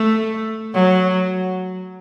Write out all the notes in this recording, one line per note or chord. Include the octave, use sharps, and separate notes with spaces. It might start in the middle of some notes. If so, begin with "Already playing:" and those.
Already playing: A3
F#3